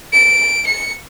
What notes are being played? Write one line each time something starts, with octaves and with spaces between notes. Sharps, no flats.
D7
C#7